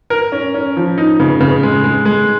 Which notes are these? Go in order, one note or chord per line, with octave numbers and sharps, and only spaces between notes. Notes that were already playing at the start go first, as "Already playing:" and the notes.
A#4
C#4
C#4
F3
D#4
C#3
C#3
G#3
G#3
G#3